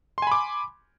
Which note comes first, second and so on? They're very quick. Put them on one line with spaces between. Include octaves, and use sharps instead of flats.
C6 G#5 B5 D6